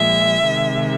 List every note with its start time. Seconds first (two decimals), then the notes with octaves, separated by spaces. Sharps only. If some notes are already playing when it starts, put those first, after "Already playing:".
Already playing: A#2 F3 G#3 E5
0.47 C3 D#3 G#3